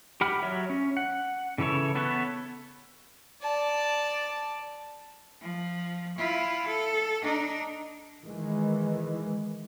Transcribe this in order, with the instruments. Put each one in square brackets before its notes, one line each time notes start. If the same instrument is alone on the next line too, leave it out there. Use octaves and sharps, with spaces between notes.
[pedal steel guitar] G4 F#5 B5 F6
F#3 C#5 E5
C#4
F#5
C#3 E3 E4 A4 C#5
B3 A4 B4 C#5
[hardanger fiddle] D5 A5
[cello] F3
E4 F4
A4
D4 D#4
[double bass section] D#3 E3 G#3